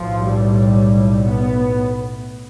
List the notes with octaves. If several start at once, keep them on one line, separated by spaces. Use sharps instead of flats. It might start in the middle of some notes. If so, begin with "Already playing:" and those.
Already playing: B1 A2 F3
G3
B3